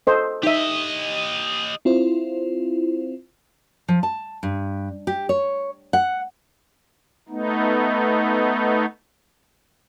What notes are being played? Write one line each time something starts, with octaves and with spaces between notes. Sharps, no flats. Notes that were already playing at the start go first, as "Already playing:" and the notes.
A4 C5 D#5
D#4 G4 D#5 E5
C4 E4 F4 C5
F3
A5
G2
G4
C#5
F#5
A3 B3 D#4